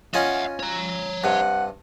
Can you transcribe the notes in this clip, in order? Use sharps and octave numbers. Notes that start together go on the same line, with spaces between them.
C#4 F4 D#5 E5 F#5
C#5 A#5
G2 C3 F#5